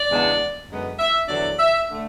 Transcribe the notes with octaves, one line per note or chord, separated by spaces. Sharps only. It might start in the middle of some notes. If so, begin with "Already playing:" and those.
Already playing: D5
E2 C#3 G#3 B3 D4
F#2 D3 G#3 B3
E5
E2 D3 F#3 B3 D4 D5
E5
D3 A3